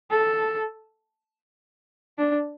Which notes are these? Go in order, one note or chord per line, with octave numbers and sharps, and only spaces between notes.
A4
D4